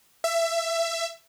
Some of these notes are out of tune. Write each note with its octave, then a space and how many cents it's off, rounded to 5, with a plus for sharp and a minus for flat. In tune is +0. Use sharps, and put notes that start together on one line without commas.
E5 +20